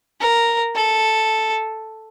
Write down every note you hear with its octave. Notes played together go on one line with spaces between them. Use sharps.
A#4
A4